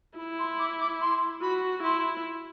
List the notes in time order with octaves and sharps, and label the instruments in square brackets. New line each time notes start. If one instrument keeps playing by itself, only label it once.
[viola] E4 [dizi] B5
[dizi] C6
D6
D6
C6
[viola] F#4 [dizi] B5
[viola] E4 [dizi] C6